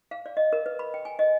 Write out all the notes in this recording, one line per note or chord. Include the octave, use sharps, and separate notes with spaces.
F5
D5
D#5
A#4
B4
B5
G5
G#5
D#5